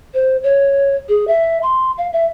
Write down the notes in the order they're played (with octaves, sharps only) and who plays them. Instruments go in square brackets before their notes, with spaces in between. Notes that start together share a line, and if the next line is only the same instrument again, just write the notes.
[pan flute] C5
C#5
G#4
E5
C6
F5
E5